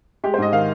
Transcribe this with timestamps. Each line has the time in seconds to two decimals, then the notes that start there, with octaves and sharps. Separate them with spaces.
0.24 G#3 G4
0.34 C5
0.38 G#2 D#5
0.53 D#3 F5